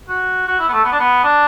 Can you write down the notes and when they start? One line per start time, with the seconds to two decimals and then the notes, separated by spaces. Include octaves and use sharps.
0.08 F#4
0.47 F#4
0.59 E4
0.68 B3
0.73 A3
0.84 B3
0.92 D4
0.99 B3
1.24 D4